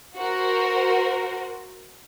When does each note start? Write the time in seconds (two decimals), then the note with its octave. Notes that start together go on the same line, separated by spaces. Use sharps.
0.17 F#4 A#4 C5